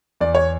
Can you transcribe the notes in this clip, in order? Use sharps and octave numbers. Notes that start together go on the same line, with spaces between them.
E2 D5
C#5